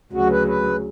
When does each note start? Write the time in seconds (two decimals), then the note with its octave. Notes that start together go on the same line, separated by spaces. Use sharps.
0.13 D2 C#3 F#3 F#4
0.30 B4
0.47 B4